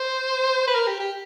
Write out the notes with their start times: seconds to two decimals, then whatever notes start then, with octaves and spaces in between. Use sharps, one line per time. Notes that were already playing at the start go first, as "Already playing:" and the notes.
Already playing: C5
0.67 B4
0.75 A#4
0.87 G4
1.00 G4